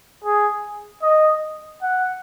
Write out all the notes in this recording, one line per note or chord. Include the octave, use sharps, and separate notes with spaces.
G#4
D#5
F#5